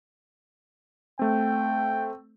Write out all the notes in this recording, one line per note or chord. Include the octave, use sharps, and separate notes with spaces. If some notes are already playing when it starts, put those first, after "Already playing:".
A3 C4 G5